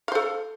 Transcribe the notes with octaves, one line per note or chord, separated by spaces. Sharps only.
A4 C5 F5